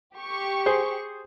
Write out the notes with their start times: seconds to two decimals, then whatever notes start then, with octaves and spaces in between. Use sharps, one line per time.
0.16 G4 C#6
0.66 G#4 C5